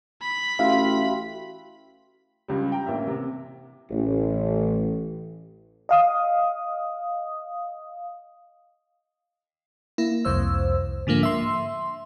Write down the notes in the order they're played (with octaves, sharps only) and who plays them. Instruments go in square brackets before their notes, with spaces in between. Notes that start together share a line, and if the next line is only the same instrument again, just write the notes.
[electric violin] B5
[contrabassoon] A1 [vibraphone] F#4 G5 C6 [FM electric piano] E5 F5
[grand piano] C#2 G3
G5 A#5
A1 A#3 E5
C3
[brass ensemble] A1
[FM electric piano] D#5 F5 D#6
A#3 E4
C2 F2 C5 E6
G#2 D3 F3 A#3
E5 C6